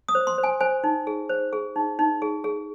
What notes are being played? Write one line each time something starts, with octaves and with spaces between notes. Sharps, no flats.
D#6
C5
C6
C5
G#5
C5 G#5
D#4
G#4
C5
G#4
D#4
D#4
G#4
G#4